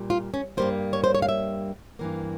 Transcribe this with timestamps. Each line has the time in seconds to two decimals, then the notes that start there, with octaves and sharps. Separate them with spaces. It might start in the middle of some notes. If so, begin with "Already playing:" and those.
Already playing: A#2 G3
0.10 F4
0.34 C#4
0.57 G2 G3 A#3 C5
0.93 C#5
1.04 C5
1.15 C#5
1.22 F5
1.29 E5
1.99 G2 E3 A#3